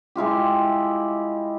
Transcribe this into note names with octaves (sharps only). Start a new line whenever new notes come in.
G#3 E4 F4 G4